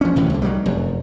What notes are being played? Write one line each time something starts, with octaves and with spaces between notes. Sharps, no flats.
F3 C#4
D2 A2 E3 F#3
C2 D3
D#3 F#3 G3 A3
F1 F#2